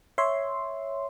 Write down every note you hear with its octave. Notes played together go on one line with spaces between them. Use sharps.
C#5 E5 C6